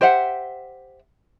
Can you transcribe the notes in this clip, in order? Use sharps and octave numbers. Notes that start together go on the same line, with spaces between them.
G4 C5 E5 F#5